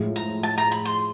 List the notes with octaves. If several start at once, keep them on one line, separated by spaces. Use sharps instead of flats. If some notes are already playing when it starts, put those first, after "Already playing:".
Already playing: A2 F3 G#3
A#5
A5
A#5
B5
C6